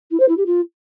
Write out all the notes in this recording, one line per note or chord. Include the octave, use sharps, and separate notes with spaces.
E4
C5
E4
G4
F4